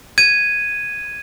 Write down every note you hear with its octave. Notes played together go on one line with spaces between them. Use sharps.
G#6 D#7